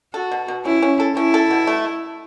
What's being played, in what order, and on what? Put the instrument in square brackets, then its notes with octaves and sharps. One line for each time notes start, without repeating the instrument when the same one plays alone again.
[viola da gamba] F#4 [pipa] A4
[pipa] B2
B2
[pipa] C#4 [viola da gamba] E4
[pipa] C#4
A4
[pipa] C#4 [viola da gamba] E4
[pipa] A4
B2
A3